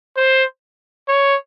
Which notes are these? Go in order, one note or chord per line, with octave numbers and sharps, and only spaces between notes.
C5
C#5